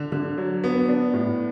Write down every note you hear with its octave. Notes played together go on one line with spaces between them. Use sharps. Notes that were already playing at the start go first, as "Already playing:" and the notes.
Already playing: D3
D3
F#3
B3
D4
A2